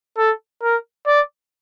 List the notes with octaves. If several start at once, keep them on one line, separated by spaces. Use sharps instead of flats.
A4
A#4
D5